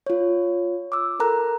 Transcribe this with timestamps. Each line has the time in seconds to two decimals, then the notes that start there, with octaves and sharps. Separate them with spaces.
0.07 F4 C#5
0.92 D6 E6
1.20 A4 A#4 A#5 F#6